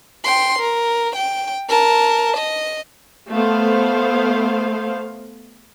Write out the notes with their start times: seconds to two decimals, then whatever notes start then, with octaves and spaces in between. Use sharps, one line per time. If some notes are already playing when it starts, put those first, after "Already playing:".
0.24 G5 C6
0.59 A#4
1.16 G5
1.69 A#4 A5
2.37 D#5
3.31 A3 B3 C5 F5